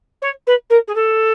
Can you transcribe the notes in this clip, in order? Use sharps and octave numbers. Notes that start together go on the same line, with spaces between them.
C#5
B4
A#4
G#4
A4